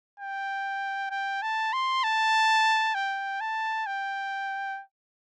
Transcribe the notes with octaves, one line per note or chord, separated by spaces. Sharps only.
G5
G5
A5
C6
A5
G5
A5
G5